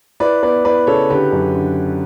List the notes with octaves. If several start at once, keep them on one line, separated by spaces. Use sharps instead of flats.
E4 B4 D5
B3 B4 D5
E4 B4 D5
C#3 A4 C#5
D3 G4 B4
F#2
D3